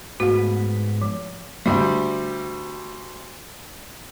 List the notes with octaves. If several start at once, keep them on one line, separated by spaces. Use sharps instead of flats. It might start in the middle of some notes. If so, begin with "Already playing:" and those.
G#2 A3 B3 F#4
F3
D2 G3